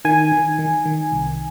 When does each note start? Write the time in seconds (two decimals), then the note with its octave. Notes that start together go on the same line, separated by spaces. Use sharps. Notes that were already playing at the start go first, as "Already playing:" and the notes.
0.05 D#3 G#5
0.32 D#3
0.59 D#3
0.85 D#3
1.12 C2